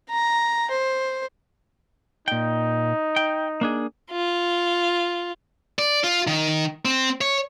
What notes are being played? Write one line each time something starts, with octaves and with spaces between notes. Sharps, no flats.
A#5
C5
A#2 D#4 G5
G5
A#3 D4 G#4
F4
D5
F4
D#3
C4
C#5